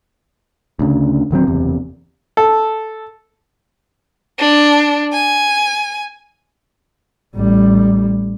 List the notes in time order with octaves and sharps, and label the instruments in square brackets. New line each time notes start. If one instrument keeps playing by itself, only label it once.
[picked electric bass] D2 C#3
D1 D#3 F#3 C4
F#1 E2 C3
[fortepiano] A4
[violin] D4
G#5
[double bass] A1 G3